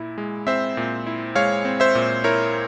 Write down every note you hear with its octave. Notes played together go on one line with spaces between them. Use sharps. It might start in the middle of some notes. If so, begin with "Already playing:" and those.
Already playing: A#2 E4
G#3
C4 C5 E5
A#2
E4
G#3 C#5 F5
C4
C5 E5
A#2
E4 A#4 C#5